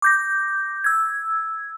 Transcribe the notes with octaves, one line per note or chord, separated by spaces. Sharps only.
D6 G6 A#6
E6 G#6